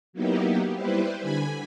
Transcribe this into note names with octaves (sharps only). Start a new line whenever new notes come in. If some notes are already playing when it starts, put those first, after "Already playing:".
F#3 A#3 B3 D#4 E4 G4
G3 E4 B4 C5
D3 G#5 B5